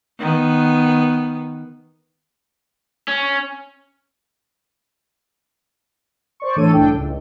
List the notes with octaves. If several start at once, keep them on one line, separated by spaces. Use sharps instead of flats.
D#3 B3
C#4
C5 D5 C#6
A2 E3 D4 A4 C#5 D#7
C2 A2 D4 A4 G5
C#2